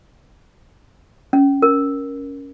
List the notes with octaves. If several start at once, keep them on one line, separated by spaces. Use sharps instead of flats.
C#4
A#4